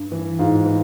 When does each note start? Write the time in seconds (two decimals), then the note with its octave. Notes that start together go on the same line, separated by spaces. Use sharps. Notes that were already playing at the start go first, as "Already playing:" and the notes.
Already playing: G2
0.12 E3
0.39 G#2 F4
0.66 E3